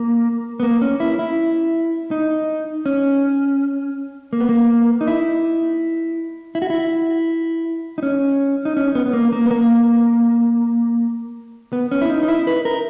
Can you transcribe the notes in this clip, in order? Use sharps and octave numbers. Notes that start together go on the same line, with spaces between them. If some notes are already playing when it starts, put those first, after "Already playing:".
Already playing: A#3
B3
A#3
C#4
E4
E4
D#4
C#4
A#3
B3
A#3
D#4
E4
E4
F#4
E4
D#4
C#4
D#4
C#4
B3
B3
A#3
A#3
B3
A#3
B3
C#4
E4
D#4
D#4
E4
B4
A#4